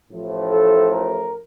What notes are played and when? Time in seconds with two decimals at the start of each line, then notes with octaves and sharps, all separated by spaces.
0.11 A1 A2 F3
0.50 A4
0.89 A#4